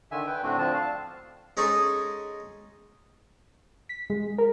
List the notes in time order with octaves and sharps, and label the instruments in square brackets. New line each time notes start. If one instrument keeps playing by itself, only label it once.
[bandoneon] D3 D#3 E5 G#5
B4 G5
A2 D3 A3 C4 D4 F#4
D3 F3 C4 D4 A5
F5 A5
[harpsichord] G#3 C#4 D#4 G#4 A4 C#5
[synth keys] B6
G#3
A#4